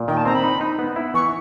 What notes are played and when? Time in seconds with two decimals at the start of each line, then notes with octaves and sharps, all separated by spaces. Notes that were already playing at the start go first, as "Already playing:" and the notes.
Already playing: A#2
0.08 D#3 G5
0.17 A5
0.25 C4 A#5
0.34 B5
0.43 D#4
0.61 D#4
0.79 B3
0.96 E4
1.14 E3 C#6